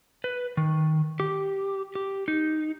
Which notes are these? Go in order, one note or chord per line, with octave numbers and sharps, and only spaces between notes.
B4
D#3
G4
G4
D#4